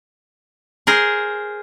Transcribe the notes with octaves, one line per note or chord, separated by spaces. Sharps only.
G#4 A#4 C5